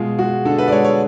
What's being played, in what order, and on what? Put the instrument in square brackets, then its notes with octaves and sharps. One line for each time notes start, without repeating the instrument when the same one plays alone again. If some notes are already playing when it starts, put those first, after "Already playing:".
Already playing: [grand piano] B2 G#3 F4
G#3 F#4
D3 A4
B4
D5
G#3 C#5
C#5